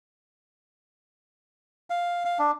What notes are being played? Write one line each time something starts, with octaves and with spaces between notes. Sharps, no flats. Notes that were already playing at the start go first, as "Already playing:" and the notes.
F5
F5
D4